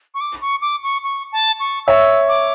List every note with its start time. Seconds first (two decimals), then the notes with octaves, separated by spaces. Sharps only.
0.14 C#6
0.21 D6
0.41 C#6
0.62 D6
0.83 C#6
1.04 C#6
1.32 A5
1.60 C#6
1.87 C#5 E5 E6
2.28 D6